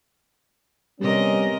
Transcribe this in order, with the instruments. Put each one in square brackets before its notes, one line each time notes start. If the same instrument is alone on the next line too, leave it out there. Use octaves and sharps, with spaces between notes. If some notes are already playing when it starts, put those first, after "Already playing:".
[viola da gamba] C3 A#4 D#5 [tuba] G3 [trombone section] B3 C#4